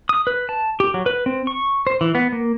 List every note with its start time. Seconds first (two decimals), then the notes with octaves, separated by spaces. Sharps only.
0.09 D#6
0.27 B4
0.49 A5
0.80 G4
0.94 F#3
1.06 B4
1.26 C4
1.47 C#6
1.87 C5
2.01 E3
2.15 B3
2.32 A#3